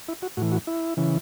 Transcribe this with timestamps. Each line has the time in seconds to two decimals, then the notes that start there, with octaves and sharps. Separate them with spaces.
0.08 E4
0.22 F#4
0.37 A2 E3 F#4
0.52 F#4
0.67 E4
0.97 C#3 E3